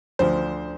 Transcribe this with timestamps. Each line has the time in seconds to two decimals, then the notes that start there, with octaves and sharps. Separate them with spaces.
0.19 D2 D3 F3 C5